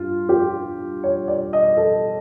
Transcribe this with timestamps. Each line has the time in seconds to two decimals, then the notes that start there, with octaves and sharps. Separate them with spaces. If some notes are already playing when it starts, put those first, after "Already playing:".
Already playing: G2 G3 F4
0.29 G4
1.03 C#5
1.28 D5
1.53 D#5
1.77 A4